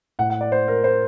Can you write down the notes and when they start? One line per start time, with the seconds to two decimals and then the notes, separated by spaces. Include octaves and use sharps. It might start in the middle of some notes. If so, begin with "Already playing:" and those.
0.19 A2 F#5
0.30 F#5
0.41 D5
0.52 C5
0.68 A#4
0.84 C5